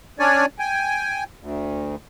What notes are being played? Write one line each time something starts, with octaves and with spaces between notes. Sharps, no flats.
C#4 D4 C#5 D5 G#5
G5 G#5
D2